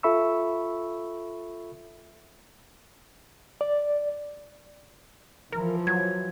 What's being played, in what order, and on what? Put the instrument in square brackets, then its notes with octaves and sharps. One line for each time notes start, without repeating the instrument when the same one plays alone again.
[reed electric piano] F4 A4 E5 B5 C#6 E6
D5
[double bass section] E3 F3 [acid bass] A#4
[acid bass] F#3 [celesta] G#6